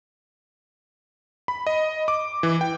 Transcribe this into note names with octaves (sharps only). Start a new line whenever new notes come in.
B5
D#5
D6
E3
G5